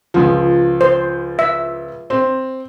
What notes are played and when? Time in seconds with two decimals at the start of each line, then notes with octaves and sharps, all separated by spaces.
0.14 C#2 F3
0.81 C5
1.39 E5
2.10 C4